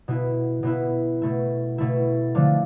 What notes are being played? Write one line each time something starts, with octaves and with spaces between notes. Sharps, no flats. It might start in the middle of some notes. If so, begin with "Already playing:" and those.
B2 B3 E4
B2 B3 E4
B2 A3 E4
B2 A3 E4
D3 F3 A3 D4 F4